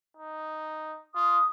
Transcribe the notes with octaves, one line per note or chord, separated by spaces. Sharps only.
D#4
F4 D#6